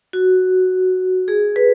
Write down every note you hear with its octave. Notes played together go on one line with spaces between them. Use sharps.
F#4
G#4
B4